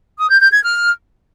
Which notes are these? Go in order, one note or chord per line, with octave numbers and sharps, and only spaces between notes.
D#6
G6
G6
G#6
F6